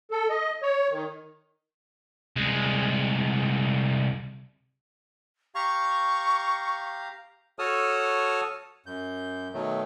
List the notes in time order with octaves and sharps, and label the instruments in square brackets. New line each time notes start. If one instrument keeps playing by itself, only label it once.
[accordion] A4
D#5
C#5
D#3
[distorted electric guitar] C2 G#3
[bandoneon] G4 F5 A#5 [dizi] C#6
[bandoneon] F#4 A4 C#5 A5 D#6 F6
F#2 G6
B2 D#3 F#3 A3